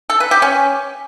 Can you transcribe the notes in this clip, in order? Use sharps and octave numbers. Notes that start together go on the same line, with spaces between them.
A4
B4
G4
C#4